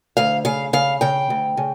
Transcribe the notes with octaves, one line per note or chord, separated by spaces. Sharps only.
D2 F5
C#3 F5
C#3 F5
C#3 G5
D2
C#3